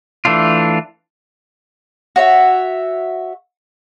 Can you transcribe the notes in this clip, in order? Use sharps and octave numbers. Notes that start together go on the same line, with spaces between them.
E3 A3 D4 F4
F#4 C#5 E5